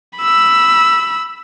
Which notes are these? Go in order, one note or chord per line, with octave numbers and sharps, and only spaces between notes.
B5 E6